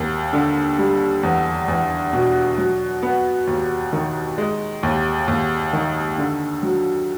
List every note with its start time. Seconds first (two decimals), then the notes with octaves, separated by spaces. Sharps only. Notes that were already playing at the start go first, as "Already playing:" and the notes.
Already playing: D#2 A#3
0.33 D3
0.78 G3
1.23 E2
1.68 E2
2.13 B2
2.58 F#3
3.03 B3
3.47 D#2
3.93 D#3
4.38 G#3
4.83 D#2
5.28 D#2
5.73 D#3
6.18 D3
6.63 F#3